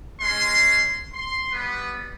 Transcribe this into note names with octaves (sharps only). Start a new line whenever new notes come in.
G#3 C#4 C6
C6
G3 B3 B4